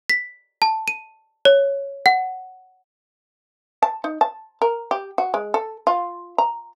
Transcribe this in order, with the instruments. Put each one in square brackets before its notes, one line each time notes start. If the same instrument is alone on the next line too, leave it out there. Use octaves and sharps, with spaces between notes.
[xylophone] B6
A5
D#7
C#5
F#5
[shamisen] A5
D#4
A5
A#4
G4
F#4
G#3
A4
F4
A#5